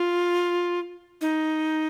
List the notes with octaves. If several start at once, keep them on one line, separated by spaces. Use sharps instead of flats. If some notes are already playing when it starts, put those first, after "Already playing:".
Already playing: F4
D#4